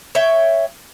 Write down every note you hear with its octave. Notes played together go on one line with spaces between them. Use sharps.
C#5 E5 G5